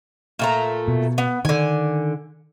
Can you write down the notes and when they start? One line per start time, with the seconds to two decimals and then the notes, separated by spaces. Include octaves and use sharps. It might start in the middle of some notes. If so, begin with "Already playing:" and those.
0.39 A#2 A3 A#5
0.88 B2
1.18 B3
1.45 D3 D#3 G#5